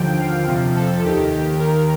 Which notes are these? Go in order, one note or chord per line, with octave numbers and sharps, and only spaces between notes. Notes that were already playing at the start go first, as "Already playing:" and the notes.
Already playing: D#2 D3 F3 G5
F5
F2 C3 F3
A4
D#2 D#3 G4
G4
D#2 D#3 A#4